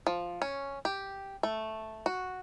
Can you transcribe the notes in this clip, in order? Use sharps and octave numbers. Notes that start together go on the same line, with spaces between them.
F3
C#4
G4
A3
F#4